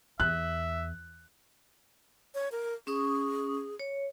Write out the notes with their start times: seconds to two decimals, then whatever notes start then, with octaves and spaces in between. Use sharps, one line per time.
0.20 E2 E5 F#6
2.35 C#5
2.52 A#4
2.87 C#4 G#4 C#6 D#6
3.80 C#5